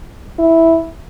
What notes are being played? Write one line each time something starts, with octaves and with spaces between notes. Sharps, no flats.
E4